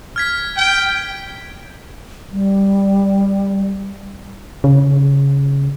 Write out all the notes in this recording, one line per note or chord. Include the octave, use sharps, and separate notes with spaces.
F6 G#6 B6
G5
G3
C#3